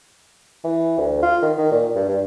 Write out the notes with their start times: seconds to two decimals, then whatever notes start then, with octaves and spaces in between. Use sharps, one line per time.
0.64 E3
0.98 D2
1.23 F4
1.42 D#3
1.58 D#3
1.72 A#2
1.95 G2
2.09 G2